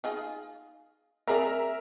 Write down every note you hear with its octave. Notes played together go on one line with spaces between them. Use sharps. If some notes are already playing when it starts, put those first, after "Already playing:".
D#4 F4 G#4
C4 G#4 A#4 D5 E5 A#5